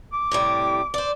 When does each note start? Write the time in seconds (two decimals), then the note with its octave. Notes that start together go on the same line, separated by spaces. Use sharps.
0.13 D6
0.31 A2 C3 G3
0.94 C5 D5